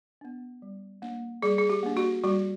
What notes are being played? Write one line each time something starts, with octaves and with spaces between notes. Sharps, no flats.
B3 D4
G3
A#3 D4
G3 G#4
G#4
G4
A#3 D4
F#4
G3 F#4